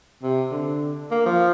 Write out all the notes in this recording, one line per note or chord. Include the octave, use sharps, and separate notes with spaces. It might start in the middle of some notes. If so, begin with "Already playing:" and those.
C3
D3
A#3
F3